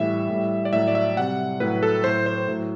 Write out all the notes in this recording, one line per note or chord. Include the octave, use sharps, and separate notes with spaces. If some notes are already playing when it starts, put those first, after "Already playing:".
Already playing: A2 E3 G3 E5
A2 G3
D5
A2 F#3 E5
D5
E5
C3 G3 F#5
A2 F#3 B4
A4
A2 F#3 C5
C5
A2 F#3